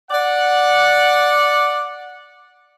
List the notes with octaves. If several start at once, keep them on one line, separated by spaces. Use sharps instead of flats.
D5 F#5